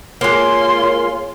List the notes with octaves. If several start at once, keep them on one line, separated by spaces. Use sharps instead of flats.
G#3 A#3 F4 C#5 C6